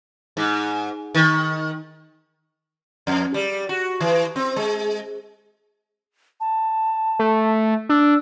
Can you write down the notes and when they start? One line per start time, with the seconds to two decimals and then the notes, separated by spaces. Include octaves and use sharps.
0.37 G#2
1.15 D#3
3.07 F2
3.34 G3
3.69 F#4
4.00 E3
4.36 C4
4.56 G#3
6.40 A5
7.19 A3
7.89 D4 E6